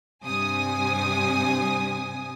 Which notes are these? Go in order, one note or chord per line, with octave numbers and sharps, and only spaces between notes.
G2 C3 G#5 D#6